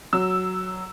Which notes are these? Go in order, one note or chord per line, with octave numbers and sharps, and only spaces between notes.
F#3 E6